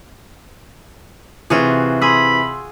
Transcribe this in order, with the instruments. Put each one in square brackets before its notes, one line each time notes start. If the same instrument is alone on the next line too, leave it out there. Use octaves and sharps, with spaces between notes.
[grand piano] C3 E3 [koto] F4 F#4 G#4
[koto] G#4 [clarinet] B5 [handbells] C6 E6